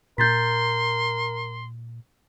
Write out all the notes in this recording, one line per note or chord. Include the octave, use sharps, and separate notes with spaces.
A#2 A#4 C6 G6 A6 B6